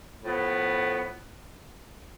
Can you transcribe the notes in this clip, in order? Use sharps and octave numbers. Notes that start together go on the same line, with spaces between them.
A2 F3 B3